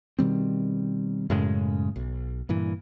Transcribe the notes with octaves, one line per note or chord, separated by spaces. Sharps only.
B2 D#3 G3 C4
F#2 A2 C#3 G#3
B1
G2 A#2 E3